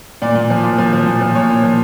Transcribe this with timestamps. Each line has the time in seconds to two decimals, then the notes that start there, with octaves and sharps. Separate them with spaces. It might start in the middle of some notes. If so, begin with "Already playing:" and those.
0.22 A#2 D5
0.35 A#2
0.50 F3
0.64 A#2
0.78 F3
0.93 F3
1.07 A#2
1.21 F3
1.35 A#2 C#5
1.50 A#2
1.64 F3